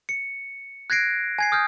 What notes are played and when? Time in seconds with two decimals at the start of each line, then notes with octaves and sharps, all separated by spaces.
0.09 C#7
0.90 F#6 G#6 A#6 C7 D7
1.39 G#5 G#6 C7
1.52 D#6 F6 G6